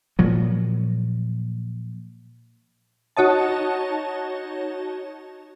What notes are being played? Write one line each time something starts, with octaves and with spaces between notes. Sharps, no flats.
A#2 F3 F#3
D#4 F#4 C#5 D#5 A5